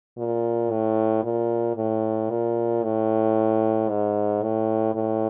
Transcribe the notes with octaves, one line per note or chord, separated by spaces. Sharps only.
A#2
A2
A#2
A2
A#2
A2
G#2
A2
A2